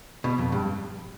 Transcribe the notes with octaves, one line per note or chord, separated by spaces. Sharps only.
B2
F2
G2